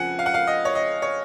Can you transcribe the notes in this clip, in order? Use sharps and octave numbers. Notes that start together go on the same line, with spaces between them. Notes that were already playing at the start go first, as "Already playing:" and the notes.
Already playing: F2 C#3 F3 F#5 G#5
F5
F#5
F5
D#5
C#5
D#5
C#5